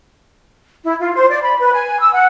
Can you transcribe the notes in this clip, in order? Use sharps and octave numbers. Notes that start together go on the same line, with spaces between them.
E4
F4
C5
D5
B5
B4
G#5
E6
F#5